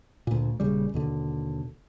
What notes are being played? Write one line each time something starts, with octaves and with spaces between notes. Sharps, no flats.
D2 A#2
D#1 C#3 G3
D#2 B2 D3